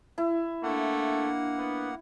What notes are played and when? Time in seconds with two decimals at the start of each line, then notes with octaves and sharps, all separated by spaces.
0.18 E4
0.63 A3 A#3 D4 F#5
1.58 B3